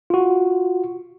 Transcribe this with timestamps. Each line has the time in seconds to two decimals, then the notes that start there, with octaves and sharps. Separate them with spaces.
0.10 F4 F#4